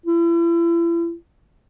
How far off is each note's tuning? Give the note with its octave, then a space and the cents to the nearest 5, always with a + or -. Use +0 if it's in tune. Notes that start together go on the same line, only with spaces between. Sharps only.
E4 +40